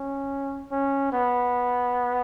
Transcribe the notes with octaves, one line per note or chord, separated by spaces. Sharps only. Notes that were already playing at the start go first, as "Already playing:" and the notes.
Already playing: C#4
C#4
B3